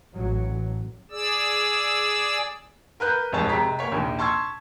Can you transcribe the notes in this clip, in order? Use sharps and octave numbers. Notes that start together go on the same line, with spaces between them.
A1 F#3
G#4 D5 E6
A#4 B4 F#6 G6
D#1 F2 G#2 C#5 A5
C3 G#3 A#5 B6
A#3 C#5 B6
A#1 D#2
A5 C6 C#6 E6 G#6